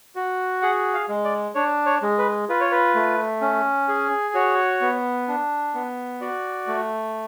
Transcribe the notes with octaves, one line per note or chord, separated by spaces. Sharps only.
F#4
G#4 F#5
F5
G#3
D5
D4 C#5
C#5
G#3
B4
F4 B4
C#5
B4
A3
C#4
G#4
F#4 C#5
B3
D4
B3
F#4 D5
A3